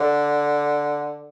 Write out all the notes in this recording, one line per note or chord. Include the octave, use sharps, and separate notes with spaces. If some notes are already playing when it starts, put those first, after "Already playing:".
Already playing: D3